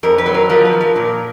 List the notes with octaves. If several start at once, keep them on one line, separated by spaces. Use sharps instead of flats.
F2 A#4
B4
F#3
A#4
F3 A#4
B4
F3
A#4
A#2 A#4